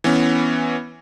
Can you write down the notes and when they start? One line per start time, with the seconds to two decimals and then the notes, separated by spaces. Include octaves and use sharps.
0.04 E3 B3 C#4